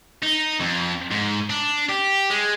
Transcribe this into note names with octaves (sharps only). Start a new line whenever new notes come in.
D#4
F2
G#2
D4
G4
G#3